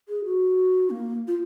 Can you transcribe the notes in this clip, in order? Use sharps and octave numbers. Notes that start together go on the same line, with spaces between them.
G#4
F#4
A#3
F4